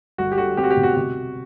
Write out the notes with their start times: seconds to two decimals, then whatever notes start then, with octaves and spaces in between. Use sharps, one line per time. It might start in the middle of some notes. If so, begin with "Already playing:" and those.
0.18 G1 F#4
0.32 G4
0.38 D3 F#4
0.57 C4 G4
0.64 F#4
0.70 G4
0.77 B2
0.83 F#4
0.96 C3 F#4